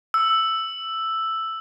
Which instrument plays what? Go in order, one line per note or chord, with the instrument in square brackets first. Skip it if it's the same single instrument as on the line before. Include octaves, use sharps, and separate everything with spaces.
[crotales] E6